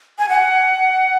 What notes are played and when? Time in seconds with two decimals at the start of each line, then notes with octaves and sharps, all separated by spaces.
0.19 G#5
0.29 F#5